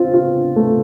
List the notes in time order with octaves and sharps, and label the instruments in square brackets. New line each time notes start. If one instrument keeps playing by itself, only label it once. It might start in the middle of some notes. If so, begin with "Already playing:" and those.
Already playing: [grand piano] C4 F4
F4
A3